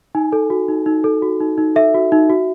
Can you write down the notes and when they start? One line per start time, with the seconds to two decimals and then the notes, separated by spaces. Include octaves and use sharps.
0.15 D#4 G#5
0.32 A4
0.50 F#4
0.68 D#4
0.86 D#4
1.04 A4
1.22 F#4
1.40 D#4
1.58 D#4
1.76 A4 E5
1.94 F#4
2.12 D#4
2.30 F#4